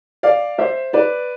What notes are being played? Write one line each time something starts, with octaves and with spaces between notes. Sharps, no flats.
D5 F5
C5 E5
B4 D5